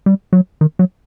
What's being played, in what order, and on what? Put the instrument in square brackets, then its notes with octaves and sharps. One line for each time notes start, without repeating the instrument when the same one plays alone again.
[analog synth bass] G3
F#3
D#3
F#3